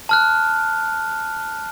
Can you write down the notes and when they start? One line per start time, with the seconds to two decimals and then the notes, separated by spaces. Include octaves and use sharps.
0.09 A5 F6 F#6